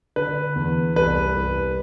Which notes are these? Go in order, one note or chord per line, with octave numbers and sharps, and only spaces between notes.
D3 B4
E2
C2 B4
C2